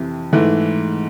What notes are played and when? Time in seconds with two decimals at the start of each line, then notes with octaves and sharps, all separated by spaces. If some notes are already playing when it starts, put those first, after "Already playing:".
Already playing: F2 C3 E3
0.33 G#2 E3 A3